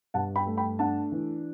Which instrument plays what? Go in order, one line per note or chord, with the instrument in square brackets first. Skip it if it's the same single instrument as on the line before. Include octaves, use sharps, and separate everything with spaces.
[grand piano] G2 F#5 A5
G5 B5
A3
G5 B5
D4 F#5 A5
E3